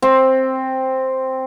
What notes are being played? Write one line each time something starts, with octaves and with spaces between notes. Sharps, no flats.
C4